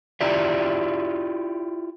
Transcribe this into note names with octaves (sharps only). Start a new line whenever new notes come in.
E4 F4 G4 D5 E5